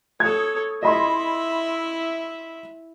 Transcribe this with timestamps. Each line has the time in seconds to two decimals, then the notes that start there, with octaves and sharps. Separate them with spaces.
0.20 A4 C#5 D#6 G#6
0.83 E4 D#5 E5 B5 C6